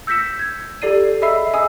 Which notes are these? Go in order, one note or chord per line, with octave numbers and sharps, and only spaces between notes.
E6 G6 A#6 B6 C#7 E7
G#6
G4 A4 D5 C7 D#7
G#4 D#5 E5 B5 E6 C7
D#5 G#5 D#6 E6